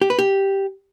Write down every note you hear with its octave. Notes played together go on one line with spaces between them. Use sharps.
G4
B4
G4